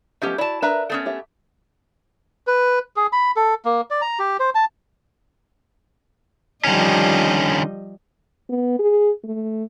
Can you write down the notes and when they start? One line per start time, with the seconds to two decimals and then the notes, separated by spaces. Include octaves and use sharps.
0.22 F3 A3 B3 C#4 G4 D#5
0.38 E4 F#4 D5 A5
0.62 D4 A#4 B4 E5 A#5
0.90 A3 B3 C#4
1.06 G4 E5
2.47 B4
2.96 G#4
3.13 B5
3.36 A4
3.65 A#3
3.91 D5
4.02 A#5
4.19 G4
4.40 C5
4.55 A5
6.64 D3 D#3 F3 G3 C#4 D#5
8.49 B3
8.79 G#4
9.24 A3